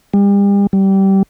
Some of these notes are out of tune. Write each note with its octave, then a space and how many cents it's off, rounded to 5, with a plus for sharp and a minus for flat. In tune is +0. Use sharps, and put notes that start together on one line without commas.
G3 +40
G3 -20